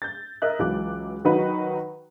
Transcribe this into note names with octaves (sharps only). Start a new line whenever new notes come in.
G6 A6
A#4 D#5 E5 F#6
C#2 E3 F#3 D6 F#6
D#3 F#3 D#4 F#4 B4